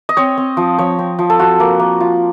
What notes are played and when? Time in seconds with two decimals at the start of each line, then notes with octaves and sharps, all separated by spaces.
0.09 D#5
0.17 C4 C#5
0.38 C4
0.57 F3
0.79 F3 C#5
0.99 C4
1.19 F3
1.30 A4
1.39 F4 F#4
1.60 A#3
1.80 A#3
2.00 F4